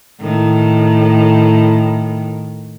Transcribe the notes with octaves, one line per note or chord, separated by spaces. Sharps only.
A2 D#3